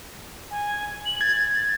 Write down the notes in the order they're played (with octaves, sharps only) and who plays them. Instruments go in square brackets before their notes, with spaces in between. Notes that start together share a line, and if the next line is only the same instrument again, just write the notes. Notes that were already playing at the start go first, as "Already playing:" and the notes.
[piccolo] G#5
F#7
[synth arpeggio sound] G#6 [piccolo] A6